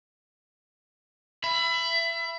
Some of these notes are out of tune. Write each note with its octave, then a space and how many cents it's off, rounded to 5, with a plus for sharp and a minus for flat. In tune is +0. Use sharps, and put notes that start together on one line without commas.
E5 +25 B5 +0